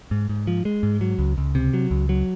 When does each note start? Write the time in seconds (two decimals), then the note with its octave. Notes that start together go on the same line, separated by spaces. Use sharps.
0.11 G#2
0.29 G#2
0.47 F3
0.65 G#3
0.83 G#2
1.01 F#3
1.19 C#2
1.38 C#2
1.55 C3
1.74 F#3
1.91 C#2
2.09 F#3